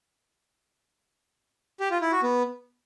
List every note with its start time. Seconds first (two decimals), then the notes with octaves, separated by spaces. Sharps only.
1.80 G4
1.91 F4
2.01 E4
2.12 F#4
2.23 B3